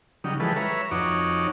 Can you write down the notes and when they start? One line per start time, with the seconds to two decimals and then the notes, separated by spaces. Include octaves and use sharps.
0.24 C#3 F#3 G3 D#4
0.40 E3 F3 G3 G#3 A4 B4
0.56 B4 C#5 E5 A#5
0.91 F2 D#4 F#4 C#5 D6